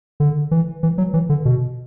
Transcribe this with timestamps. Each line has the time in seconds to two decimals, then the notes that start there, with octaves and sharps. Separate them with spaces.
0.20 D3
0.51 E3
0.83 E3
0.98 F#3
1.14 E3
1.29 D3
1.45 B2